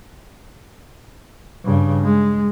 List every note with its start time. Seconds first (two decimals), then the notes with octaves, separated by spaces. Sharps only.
1.65 G2 C#3
2.04 G#3